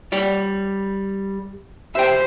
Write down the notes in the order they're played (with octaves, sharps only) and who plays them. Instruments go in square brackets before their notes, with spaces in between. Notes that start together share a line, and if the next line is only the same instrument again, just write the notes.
[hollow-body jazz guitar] G3 C#5 D5
[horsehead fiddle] G4 C5 [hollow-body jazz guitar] E5 G5